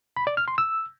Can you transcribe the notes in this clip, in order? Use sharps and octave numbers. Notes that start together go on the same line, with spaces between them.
B5
D5
F6
C6
E6